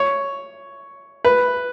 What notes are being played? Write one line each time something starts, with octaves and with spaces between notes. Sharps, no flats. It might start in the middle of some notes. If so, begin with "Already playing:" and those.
Already playing: C#5
B4